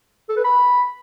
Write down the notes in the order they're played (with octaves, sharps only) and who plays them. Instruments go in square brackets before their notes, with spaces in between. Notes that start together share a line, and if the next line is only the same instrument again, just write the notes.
[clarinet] A4
B4
B5